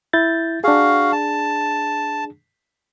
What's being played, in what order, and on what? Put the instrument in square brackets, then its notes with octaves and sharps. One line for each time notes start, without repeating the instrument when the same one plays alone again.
[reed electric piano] E4 G6 A6
[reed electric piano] D4 G#4 [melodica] F#4 F5
[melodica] A5